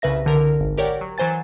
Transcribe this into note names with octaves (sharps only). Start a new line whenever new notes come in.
C2 C#3 B4 E5 A#6
C2 D3 A#4
G#1
G4 A#4 C#5 D5 F#5 G5
F#3
E3 F#3 C5 G#5 A6